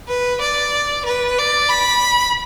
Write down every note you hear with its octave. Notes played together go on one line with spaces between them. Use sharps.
B4
D5
B4
D5
B5